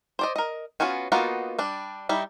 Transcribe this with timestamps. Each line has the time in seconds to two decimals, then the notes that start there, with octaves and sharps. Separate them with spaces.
0.19 C5 D5 D#5
0.36 A#4 D#5
0.80 B3 C#4 F4 F#4 G#5
1.12 A#3 B3 D#4 F4 F#4
1.59 G3 D4
2.09 G3 D#4 E4